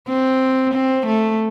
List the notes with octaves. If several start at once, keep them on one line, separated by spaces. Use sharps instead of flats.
C4
C4
A3